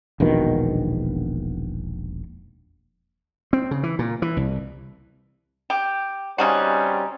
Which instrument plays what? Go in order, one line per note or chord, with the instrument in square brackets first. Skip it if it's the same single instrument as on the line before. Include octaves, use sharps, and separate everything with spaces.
[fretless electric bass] E1 A#1 B2 D#3
[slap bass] C4
C#3
E3
A#2
E3
C2
[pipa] G4
[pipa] C#3 D#4 F#4 [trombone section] G3 C4 C#4